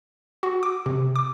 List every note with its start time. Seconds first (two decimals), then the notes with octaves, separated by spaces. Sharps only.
0.43 F#4
0.63 D6
0.86 C3
1.16 D6